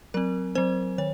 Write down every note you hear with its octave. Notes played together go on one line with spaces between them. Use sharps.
F#3 C4 A#4
F#3 C4 C5
D#3 C#5